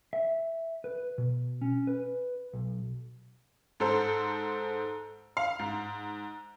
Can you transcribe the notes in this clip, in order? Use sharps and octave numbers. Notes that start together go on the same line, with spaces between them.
E5
B4
B2
C#4
B4
B1
G#2 A4 C5
F5
G#2